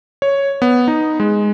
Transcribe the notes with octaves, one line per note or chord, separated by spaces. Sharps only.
C#5
B3
D#4
G#3